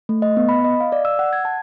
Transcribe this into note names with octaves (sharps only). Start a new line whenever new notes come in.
A3
D#5
B3
B5
D#5
F5
D5
E6
F#5
G#6
A5